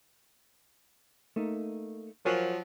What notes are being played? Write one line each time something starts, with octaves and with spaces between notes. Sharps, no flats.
A3 A#3 D#4
F3 F#3 A#4 G#5 C6